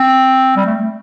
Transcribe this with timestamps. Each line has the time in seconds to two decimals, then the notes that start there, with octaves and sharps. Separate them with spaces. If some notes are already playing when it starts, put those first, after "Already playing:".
Already playing: C4
0.57 G3
0.66 A3
0.79 A3